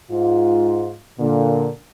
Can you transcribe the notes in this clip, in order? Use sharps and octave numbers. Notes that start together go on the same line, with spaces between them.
G#2 F4
A#2 D3